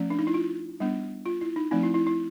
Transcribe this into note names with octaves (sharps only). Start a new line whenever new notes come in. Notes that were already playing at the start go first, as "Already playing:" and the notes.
Already playing: F3 A3 C#4
D4
D#4
E4
F4
G3 B3 D4
F4
E4
D#4
F3 A3 C4 D#4
E4
E4
E4